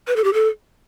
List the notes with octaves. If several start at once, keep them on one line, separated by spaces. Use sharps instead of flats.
B4
A4
G4
A4